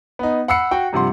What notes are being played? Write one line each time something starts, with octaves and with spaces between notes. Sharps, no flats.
B3 D#4
F#5 B5 E6 C7 C#7
F#4 G5
G2 C3 F3 F#5 C6